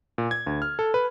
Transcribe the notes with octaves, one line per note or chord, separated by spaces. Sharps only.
A#2
G#6
D2
F6
A4
B4